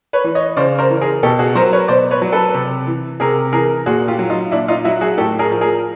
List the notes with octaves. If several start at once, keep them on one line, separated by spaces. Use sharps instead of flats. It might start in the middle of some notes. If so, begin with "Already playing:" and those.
B4 C#5
E3
C#5 D#5
C#3 C5 D5
A#4 C5
E3
G#4 A#4
B2 G4 A4
F#4 G#4
F#3 A#4 C5
B4 C#5
B2 C5 D5
B4 C#5
F#3
A4 B4
C3
E3
C3 G#4 A#4
E3 G#4 A#4
A#2 F#4 G#4
F4 G4
F#3
D#4 F4
A#2 D4 E4
D#4 F4
F#3 E4 F#4
F#4 G#4
A2 G4 A4
G#4 A#4
F3
G#4 A#4